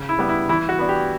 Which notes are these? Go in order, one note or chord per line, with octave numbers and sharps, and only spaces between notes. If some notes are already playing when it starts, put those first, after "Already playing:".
Already playing: C#3
E4
G3 B3 D4
E4
E3 E4
F#4
B3 D4
G4